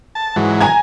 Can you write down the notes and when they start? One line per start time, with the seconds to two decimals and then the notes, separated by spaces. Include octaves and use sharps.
0.15 A5
0.36 G#2 E3 F#3
0.61 G#5 A#5 G#6